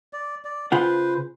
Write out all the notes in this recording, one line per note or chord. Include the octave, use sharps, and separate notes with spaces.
D5
D5
C#3 F4 B4 C5 F#5